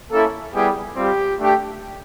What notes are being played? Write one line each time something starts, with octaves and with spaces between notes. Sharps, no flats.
A#3 C#4 E4 A4
G3 B3 E4 G4 G#4
G3 C4 F4 G4
A3 D4 G4